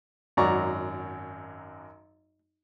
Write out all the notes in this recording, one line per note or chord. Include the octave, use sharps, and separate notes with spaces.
G#1 F#2 F#3 D5 A#5 C#6